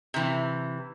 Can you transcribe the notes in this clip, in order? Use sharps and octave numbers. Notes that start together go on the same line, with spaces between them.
C3 E3